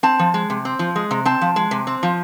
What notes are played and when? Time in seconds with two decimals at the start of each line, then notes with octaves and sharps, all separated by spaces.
0.03 C4 A5
0.19 F3
0.34 G#3
0.50 C3
0.65 C4
0.79 F3
0.96 G#3
1.11 C3
1.25 C4 A5
1.41 F3
1.56 G#3
1.71 C3
1.87 C4
2.03 F3